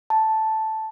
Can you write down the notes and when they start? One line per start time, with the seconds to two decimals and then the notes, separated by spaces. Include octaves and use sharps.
0.10 A5